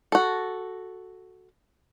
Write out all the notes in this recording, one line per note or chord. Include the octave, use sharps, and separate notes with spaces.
F#4 A4